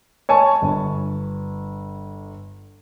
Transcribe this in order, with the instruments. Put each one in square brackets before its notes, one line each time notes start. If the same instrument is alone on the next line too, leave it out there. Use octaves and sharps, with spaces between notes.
[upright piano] C#5 G#5 A5 C#6
G1